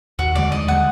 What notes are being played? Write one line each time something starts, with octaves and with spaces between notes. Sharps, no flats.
D#2 F#4
D3 G#3 D5
D#2 D#5
D3 G#3 F#5